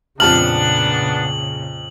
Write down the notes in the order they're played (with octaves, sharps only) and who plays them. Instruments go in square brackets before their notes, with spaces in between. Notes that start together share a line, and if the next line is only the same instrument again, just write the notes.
[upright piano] F2 A5 F6 [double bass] A#2 C#3 [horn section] B3 D4 [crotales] F#7